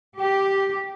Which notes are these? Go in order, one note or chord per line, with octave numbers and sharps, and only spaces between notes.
G4